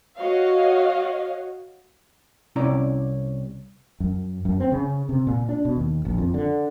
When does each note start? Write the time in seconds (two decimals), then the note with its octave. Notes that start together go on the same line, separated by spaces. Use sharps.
0.19 F#4 C#5 D#5 F5
2.56 C2 C3 C#4 E4 D5 A#5
4.00 F#2
4.45 F#2
4.60 C4
4.72 C#3
5.09 C3
5.27 A#2
5.49 D4
5.65 B2
5.76 D#2
6.05 A#1
6.18 F2
6.34 D3